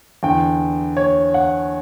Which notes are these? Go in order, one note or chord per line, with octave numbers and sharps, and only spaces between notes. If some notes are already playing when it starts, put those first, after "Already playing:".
E2 D3 G5
C#5
F#5